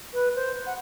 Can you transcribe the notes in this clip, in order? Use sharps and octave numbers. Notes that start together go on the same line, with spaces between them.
B4
C5
F#5